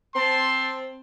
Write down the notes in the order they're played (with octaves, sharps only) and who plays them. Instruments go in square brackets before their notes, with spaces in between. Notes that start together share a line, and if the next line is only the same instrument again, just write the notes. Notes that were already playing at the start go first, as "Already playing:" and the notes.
[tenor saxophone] C4 [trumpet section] A5 C6